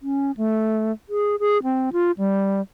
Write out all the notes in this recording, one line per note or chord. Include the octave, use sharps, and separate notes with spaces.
C#4
A3
G#4
G#4
C4
F4
G3